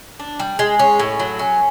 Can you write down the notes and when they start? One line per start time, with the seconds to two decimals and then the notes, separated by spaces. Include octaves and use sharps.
0.20 D4
0.40 G3
0.59 G#3
0.79 C#4
0.99 A2
1.19 F#3
1.39 C#4